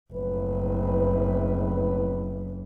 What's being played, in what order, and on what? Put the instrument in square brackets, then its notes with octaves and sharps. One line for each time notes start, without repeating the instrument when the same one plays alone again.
[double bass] F#1 [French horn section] F2 A2 B4